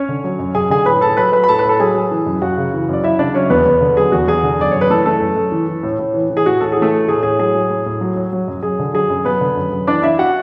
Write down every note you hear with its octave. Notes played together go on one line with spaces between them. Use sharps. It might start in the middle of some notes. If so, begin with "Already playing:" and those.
Already playing: C#4 C#5
D3
F#3
F#2
F#2 G#4 G#5
D3 G#4 G#5
A2 B4 B5
A2 A4 A5
F#3 B4 B5
F#3 B4 B5
B5
A2 A4 A5
B4 B5
A2 A4 A5
F#3 G#4 G#5
F#3
E3
F#2
F#2 F#4 F#5
C#3
E3
F#2 D5
F#2 E4 E5
C#3 D4 D5
F#3 C#4 C#5
E2 B3 B4
E2
D3
F#3 G#4
E2 F#4
E2 G#4
D3
F#2 D5
F#2 C#5
B4
E3 A3 A4
E3 A3 A4
F#2
F#2
E3
E3
A2
A2
E3
E3
G#4
A2 F#4
A2 A4
E3 G#4
A3 A4
E3
A2 G#4
A2 G#4
F#3 G#4
F#3
A2
A2
F#3
F#3
F#3
F#2
F#2 G#4
D3
F#3 G#4
F#2
F#2 B3 B4
D3
F#2
F#2
E3 D4 D5
E3 E4 E5
F#4 F#5